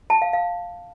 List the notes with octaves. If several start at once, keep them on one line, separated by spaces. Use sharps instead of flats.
A5
F5
F5